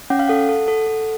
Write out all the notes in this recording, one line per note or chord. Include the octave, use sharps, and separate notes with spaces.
C#4 F#5
F5
A4 F#5
A4
A4
A4